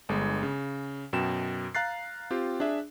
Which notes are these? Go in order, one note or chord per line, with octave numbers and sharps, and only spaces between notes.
G1 G#3
C#3
F#2 B2 G5 E7
F5 A#5 F#6 A6 C7
C4 F4 G4
D4 G#4 E5